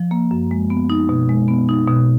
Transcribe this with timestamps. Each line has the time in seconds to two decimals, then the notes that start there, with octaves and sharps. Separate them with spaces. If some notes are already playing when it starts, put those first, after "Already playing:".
Already playing: F3
0.11 A#3
0.31 F#2
0.51 G#3
0.70 B3
0.90 D#4
1.09 B2
1.29 G#3
1.48 B3
1.69 D#4
1.87 B2